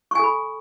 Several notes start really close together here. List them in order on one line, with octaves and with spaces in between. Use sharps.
C#6 G#5 A4 B5